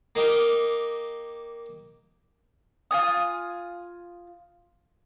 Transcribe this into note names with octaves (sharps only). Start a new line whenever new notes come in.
A#3 D#4 G4
F4 G#5 D#6